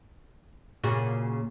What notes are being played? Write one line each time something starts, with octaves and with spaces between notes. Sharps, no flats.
A#2 C#3 F#4